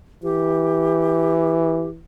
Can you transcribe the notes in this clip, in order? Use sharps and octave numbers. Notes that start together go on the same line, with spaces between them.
E3 G4